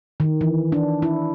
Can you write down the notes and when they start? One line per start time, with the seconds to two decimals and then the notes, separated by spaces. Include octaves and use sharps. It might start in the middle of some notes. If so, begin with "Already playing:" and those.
0.20 D#3
0.41 E3
0.72 D4
1.02 E4